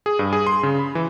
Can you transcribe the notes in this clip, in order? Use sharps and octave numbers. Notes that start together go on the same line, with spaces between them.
G#4
G2
G#4
C6
C#3
B5
E3